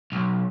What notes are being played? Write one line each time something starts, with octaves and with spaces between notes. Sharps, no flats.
B1